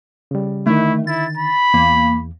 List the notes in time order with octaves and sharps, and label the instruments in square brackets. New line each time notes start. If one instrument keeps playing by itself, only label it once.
[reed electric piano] C#3 G3
[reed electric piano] D3 D#3 [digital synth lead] A3 [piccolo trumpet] E4
[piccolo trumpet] E4 [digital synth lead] A6
[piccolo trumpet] B5
[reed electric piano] E2 [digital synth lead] A#3